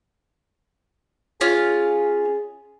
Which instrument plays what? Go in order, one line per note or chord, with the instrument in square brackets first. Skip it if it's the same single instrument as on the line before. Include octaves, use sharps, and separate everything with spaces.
[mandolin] C#4 F4 [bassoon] G#4